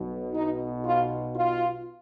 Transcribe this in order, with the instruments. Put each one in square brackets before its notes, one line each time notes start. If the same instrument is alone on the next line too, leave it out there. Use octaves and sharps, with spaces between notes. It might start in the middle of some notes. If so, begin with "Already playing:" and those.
Already playing: [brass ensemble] B1 B2
D#4
F4
F4